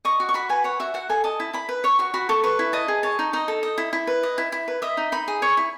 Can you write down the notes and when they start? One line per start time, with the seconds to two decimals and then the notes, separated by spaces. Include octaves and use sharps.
0.05 D#5 C#6
0.20 F#4
0.29 C#6
0.34 F#4 B5
0.49 B4 G#5
0.64 C#5 F#5
0.80 F#4 E5
0.94 F#4 F#5
1.09 A4 G#5
1.24 D#5 A5
1.40 E4
1.53 E4 B5
1.69 B4
1.84 C#5 C#6
1.99 F#4 C#6
2.14 F#4 B5
2.29 A4 C#6
2.44 B4 C#6
2.59 E4
2.73 D#5 A5
2.88 G#4
3.03 C#5 A5
3.19 D#4
3.33 D#4 D#5
3.48 A4
3.63 D#5
3.78 E4
3.93 E4
4.07 B4
4.23 D#5
4.38 E4
4.52 E4
4.68 B4
4.82 D#5 E5
4.97 D#4
5.12 D#4 B5
5.28 G#4
5.42 C#5 C#6
5.57 E4